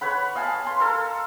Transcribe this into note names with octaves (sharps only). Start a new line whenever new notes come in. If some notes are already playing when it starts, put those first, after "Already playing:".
B4 C#5 F#5 B5
D#5 F5 G#5 A5
G#5
C6
A4 A#4